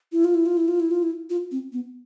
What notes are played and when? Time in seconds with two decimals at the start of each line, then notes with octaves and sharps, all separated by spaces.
0.12 E4
0.24 F4
0.35 E4
0.46 F4
0.57 E4
0.68 F4
0.80 E4
0.91 F4
1.03 E4
1.30 F4
1.51 C4
1.73 B3